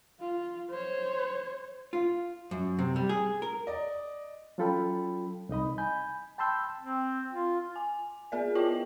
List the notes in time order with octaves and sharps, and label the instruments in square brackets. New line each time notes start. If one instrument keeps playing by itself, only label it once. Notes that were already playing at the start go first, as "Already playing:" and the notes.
[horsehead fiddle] F4
C5 C#5
[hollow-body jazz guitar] F4
F#2
C3
G3
G#4
A#4
[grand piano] D5 D#5
[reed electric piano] F#3 C#4 F4 A4 G5 B5
C2 D#4 D#5 B5
G#5 B5 G6
G5 A5 B5 C6 E6 G6
[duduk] C4
F4
[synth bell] G#5
B3 G#4 A#4 D5
E4 F4 C#5 D#5 G5 F#7